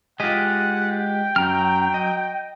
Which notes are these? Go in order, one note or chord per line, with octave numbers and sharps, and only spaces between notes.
G#3 F4 G4 D#5 F#5
G5
F#2 F#3 A#5 F6
D#5